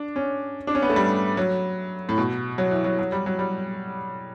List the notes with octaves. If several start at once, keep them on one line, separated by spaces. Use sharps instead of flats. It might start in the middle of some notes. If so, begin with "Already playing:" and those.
Already playing: D4
C#4
D4
C#4
B3
A3
G3
F#3
A2
B2
F#3
E3
F#3
F#3
G3
F#3
G3